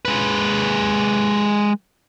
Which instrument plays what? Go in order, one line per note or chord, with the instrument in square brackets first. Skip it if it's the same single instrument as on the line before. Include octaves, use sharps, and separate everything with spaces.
[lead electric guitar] G#3 B4